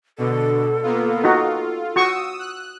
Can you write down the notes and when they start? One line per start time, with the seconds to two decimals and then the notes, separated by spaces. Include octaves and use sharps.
0.18 B2 D3 A4
0.83 A#3 B3 F4
1.24 D#4 F4 F#4
1.96 F#4 C#6 D#6 E6
2.39 F#6